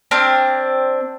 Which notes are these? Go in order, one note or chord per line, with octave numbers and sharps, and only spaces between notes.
C4 D4 F6